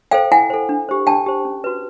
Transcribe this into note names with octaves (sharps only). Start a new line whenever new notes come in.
A4 C5 F5 G5
E4 F#5 G#5
A4 C5
D4
G4 C5
D4 G5 A5
G4 C5
C#4
F#4 B4